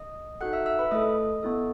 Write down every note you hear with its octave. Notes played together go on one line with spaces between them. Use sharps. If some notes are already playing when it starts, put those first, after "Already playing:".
Already playing: D#5 D#6
D#4 F#4 A4 F#5 F#6
E5 E6
E5 E6
B4 B5
A3 E4 A4 D#5 D#6
B3 E4 A4